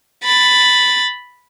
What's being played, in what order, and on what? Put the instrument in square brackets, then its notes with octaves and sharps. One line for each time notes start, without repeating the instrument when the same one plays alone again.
[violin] B5 A6